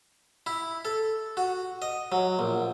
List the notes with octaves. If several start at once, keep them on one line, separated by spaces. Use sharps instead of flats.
E4
A4
F#4
D#5
F#3
A#1